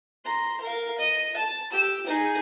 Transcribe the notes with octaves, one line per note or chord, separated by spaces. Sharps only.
A#5 C6
A#4 F5
D#5
A5
G4 E6
D#4 G#4